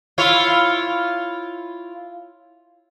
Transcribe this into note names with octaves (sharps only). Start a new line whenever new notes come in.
E4 F4 C#5